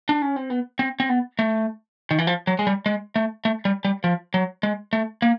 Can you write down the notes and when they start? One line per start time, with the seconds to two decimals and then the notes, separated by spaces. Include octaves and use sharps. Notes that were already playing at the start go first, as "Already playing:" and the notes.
0.09 D4
0.22 C#4
0.36 C4
0.50 B3
0.79 C4
1.00 C4
1.09 B3
1.39 A3
2.11 D#3
2.18 E3
2.27 F3
2.47 F#3
2.59 G#3
2.67 G3
2.86 G#3
3.16 A3
3.45 A3
3.65 G3
3.85 G3
4.04 F3
4.34 F#3
4.63 G#3
4.93 A3
5.22 A#3